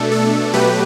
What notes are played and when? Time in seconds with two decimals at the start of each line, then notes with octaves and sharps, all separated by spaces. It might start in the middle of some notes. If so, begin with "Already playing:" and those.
Already playing: B2 A3 D4 A4
0.12 A4
0.54 B2 F#3 A3 G4 B4